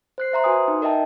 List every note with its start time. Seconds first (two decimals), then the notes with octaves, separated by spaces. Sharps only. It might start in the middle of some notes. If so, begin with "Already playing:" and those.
0.18 C5 F#6 C7
0.32 C5 E5 A#5 C6
0.44 F#4 B4 G#5 D#6
0.68 D#4
0.82 A#4 D#5 E5 G5 A5